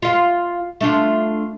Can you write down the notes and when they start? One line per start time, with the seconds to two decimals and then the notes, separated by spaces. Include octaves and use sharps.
0.02 F4 F5
0.81 A3 D4 F4